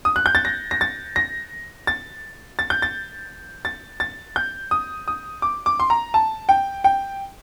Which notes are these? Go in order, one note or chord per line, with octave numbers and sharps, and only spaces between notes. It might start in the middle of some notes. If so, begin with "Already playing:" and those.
D#6
F#6
G6
A6
A#6
A#6
A6
A#6
A6
A6
G6
A6
A6
A6
G6
D#6
D#6
D6
D6
C6
A#5
A5
G5
G5